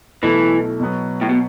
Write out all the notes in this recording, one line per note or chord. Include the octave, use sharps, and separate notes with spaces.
B1 B2 E3 A3 E4 A4
B2 F#3 B3
A2
B2